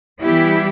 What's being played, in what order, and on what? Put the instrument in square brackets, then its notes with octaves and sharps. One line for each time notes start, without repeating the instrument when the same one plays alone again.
[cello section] E3 G3 B3 E4 G4